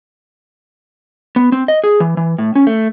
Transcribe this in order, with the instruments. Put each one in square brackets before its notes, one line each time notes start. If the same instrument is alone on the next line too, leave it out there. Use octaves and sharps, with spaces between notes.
[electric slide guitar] B3
C4
D#5
G#4
E3
E3
A2
C#4
A3